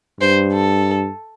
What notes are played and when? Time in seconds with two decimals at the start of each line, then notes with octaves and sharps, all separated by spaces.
0.20 G2 C5
0.54 A4